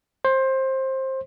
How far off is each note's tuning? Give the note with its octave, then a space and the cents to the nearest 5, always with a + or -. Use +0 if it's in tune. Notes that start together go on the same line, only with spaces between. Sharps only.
C5 +20